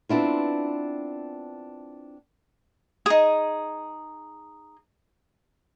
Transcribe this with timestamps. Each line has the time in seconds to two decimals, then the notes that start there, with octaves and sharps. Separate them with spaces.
0.09 B3 C4 D4 E4 F4
3.06 D#4 G#4